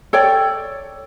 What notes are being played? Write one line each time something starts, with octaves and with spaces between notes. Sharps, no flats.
A4 C#5 D5 G5